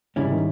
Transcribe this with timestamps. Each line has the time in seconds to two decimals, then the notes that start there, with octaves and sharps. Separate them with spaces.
0.16 G#2 C#3 G3 C#4 E4
0.32 D#3